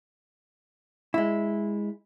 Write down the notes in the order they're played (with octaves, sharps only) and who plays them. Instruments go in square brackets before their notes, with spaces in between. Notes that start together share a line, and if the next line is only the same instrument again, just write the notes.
[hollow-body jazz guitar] G#3 E4